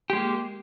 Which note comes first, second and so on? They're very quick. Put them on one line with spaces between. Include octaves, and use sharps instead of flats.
G4 G#3 A#3